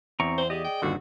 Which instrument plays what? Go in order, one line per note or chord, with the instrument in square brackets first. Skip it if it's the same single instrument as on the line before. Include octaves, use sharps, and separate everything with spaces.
[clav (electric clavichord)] E2 [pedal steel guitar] C4 A#5 C#6
[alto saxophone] C5
[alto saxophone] G4 [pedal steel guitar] G#4 D5 D#5
[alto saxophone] G5
[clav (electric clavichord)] G1 D#2 D3 [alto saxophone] F#4